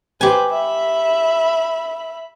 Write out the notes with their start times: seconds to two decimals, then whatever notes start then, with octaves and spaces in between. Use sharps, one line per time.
0.21 G4 B4 C5 G#5
0.50 E5 B5